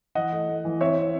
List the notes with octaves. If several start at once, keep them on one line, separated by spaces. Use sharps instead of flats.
E3 D#5 F#5
A3
A3
E3
C4 C#5 E5
C4